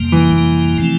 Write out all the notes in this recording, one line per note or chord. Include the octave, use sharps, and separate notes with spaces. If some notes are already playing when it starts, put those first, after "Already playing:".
Already playing: F2 C3 G3 A#3
E3
F2 C3 G3 A#3
C3 F3 A3 C4